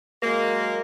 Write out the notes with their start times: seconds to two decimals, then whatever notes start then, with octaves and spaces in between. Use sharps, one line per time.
0.23 F#3 G#3 A#3